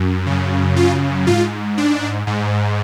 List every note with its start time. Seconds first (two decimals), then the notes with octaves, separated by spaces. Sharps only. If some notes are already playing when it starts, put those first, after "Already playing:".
Already playing: F#2
0.26 F#2 C#3
0.76 F4
1.27 G#2 F4
1.78 D4
2.27 G#2